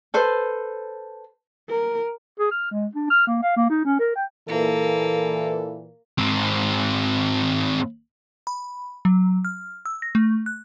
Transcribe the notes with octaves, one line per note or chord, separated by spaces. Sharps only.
A4 B4 C5
A#4
G#4
F6
G#3
D4
F6
A#3
F5
A#3
D#4
C#4
A#4
G5
A#2 E3 A#3 A4
G#2 C4
B5
F#3
F6
E6
A#6
A3
F#6